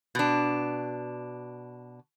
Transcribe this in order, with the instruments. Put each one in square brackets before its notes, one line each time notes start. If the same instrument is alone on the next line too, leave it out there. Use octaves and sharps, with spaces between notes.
[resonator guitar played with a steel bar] B2 D4